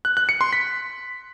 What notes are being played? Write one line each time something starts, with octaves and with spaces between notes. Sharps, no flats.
F#6
F#6
C#7
C6
B6